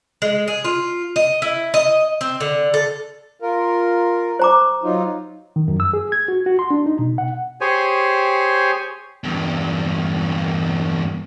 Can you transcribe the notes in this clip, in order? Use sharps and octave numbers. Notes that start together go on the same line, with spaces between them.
G#3
G#4
F4
D#5
E4
D#5
C4
D3
A4
F4 A#4
C5 A#5 D6
F#3 D#4 F4
D#3
F#2
E6
G#4
G#6
F#4
F#4
C6
D4
D#4
B2
F#5
G4 G#4 C5 C#5 G#5
E2 G2